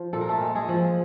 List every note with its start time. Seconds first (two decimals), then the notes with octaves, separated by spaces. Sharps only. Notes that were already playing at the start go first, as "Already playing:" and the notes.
Already playing: F3
0.13 A#2 A4
0.21 A#4
0.29 A3 A4
0.41 G#3
0.55 G#3 G#4
0.69 F3